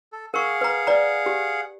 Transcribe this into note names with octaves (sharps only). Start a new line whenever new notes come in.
A4
G#4 A#4 F5 F#5 C#6
B4 A#5
B4 D5 A#5
G4